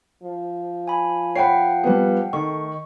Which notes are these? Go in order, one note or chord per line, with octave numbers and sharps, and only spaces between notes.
F3
G#5 B5
C#5 F#5 G5 B5 C7
G3 B3
D#3 A3 C#6